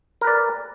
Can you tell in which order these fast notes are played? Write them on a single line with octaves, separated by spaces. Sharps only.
A#4 B4 D5